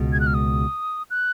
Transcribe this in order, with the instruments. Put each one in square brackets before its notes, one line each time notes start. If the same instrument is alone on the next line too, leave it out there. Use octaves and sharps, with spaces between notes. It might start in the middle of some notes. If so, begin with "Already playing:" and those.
Already playing: [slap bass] C#2 B2 G#3
[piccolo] G#6
F#6
F6
D#6
F#6